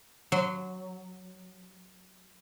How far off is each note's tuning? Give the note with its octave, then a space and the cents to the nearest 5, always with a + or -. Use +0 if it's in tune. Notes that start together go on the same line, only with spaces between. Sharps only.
F#3 +0 C6 -25